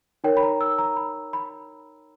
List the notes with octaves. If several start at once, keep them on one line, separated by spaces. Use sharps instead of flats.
D#4 A#4 C#5 G5
B5
A#5
E6
A#5
B5
B5